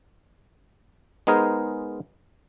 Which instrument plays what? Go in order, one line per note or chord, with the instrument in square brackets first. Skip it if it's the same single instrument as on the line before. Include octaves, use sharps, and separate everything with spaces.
[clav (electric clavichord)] G#3 B3 D#4 G#4 A#4 C5